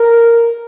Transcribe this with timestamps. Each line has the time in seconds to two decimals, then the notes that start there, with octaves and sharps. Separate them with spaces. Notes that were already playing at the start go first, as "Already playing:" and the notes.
Already playing: A#4